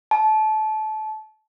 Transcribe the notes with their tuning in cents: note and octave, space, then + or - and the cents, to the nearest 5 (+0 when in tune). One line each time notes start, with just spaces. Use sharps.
A5 -25